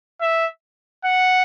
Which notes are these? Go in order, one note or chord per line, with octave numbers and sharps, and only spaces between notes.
E5
F#5